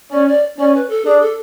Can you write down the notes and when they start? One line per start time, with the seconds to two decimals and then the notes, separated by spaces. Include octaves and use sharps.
0.12 C#4 D5
0.28 D5
0.59 C#4 D5
0.75 B4
0.89 A4
1.05 D4 G#4
1.21 A4